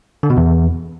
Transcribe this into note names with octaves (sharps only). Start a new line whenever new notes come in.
D3
B2
E2